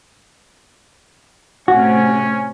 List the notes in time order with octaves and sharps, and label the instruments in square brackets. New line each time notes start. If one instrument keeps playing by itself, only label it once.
[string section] A2 C3 [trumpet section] C#4 [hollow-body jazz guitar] F#4